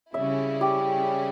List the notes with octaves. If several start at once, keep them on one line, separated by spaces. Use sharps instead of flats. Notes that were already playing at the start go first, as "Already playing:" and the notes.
C#3 G3 C#4 E4 E5
G4